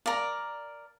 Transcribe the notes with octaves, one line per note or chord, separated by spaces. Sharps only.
A#4 D5 F5 A#5